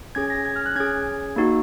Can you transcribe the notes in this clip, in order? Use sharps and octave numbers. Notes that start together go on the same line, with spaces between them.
C#4 G#4 G#6
A#6
G#6
F6
F#6
C#4 G#4 G#6
A#3 D#4 F#4